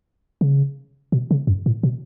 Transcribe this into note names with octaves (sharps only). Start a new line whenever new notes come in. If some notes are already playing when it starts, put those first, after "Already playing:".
C#3
B2
C#3
F#2
A2
B2